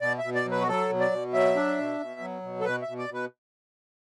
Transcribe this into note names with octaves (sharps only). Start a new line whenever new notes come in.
B2 D5
E5
B2
D5
F#3
B4
F#4
F#3 A4
B2
D5
B2
F#3 E5
D4
B2
B2
F#3
B2
A4
B2 B4
E5
B2
D5
B2 B4